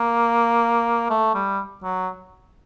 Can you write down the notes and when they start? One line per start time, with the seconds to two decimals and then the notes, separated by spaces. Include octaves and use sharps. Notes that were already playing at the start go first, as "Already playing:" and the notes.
Already playing: A#3
1.10 A3
1.34 G3
1.83 F#3